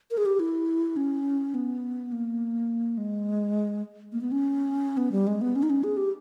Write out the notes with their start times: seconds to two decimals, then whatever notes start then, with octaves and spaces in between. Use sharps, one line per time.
0.11 A#4
0.18 G#4
0.26 G4
0.40 E4
0.97 C#4
1.54 B3
2.12 A#3
2.98 G#3
4.13 A#3
4.21 B3
4.32 C#4
4.97 B3
5.12 G3
5.27 G#3
5.41 B3
5.56 C#4
5.63 D#4
5.70 C#4
5.84 G#4
5.97 G4